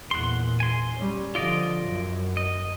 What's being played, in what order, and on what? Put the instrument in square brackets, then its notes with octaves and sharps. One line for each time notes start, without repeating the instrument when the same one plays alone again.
[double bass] E2 A#2 [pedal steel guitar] F#5 C6
[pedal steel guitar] G#5 C6
[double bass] G3 C#4
[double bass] D3 F3 [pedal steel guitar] F4 D5 D#5
[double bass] F#2
[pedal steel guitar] D#5